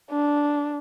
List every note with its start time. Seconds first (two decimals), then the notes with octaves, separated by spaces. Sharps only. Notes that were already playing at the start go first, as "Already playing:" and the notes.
0.11 D4